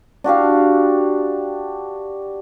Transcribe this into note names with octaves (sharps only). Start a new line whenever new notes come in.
D4 F#4 G4 F5